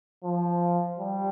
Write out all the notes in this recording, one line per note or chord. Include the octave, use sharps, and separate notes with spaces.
F3
G3